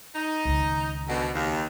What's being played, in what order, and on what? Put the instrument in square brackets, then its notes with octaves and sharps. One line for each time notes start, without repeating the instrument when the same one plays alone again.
[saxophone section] D#4
[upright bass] C#2 D#3
[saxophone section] D2 B2
D#2